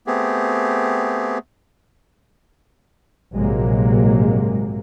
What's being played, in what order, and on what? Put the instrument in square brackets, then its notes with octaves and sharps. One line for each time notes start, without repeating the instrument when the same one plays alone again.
[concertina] A3 B3 C4 G4 G#4
[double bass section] A#1 G#2 C3 F#3 G#3 A#3